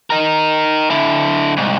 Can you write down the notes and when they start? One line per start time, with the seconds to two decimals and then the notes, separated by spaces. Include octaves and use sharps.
0.10 D#4 A#4
0.90 D3 E4
1.57 C2 G#2